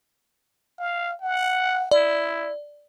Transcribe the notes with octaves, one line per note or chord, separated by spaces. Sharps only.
F5
F#5
E4 D5